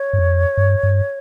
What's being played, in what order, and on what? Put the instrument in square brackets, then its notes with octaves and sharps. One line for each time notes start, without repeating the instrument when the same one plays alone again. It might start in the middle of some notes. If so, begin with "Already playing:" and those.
Already playing: [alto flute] C#5
[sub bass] G2
F2
G2
G2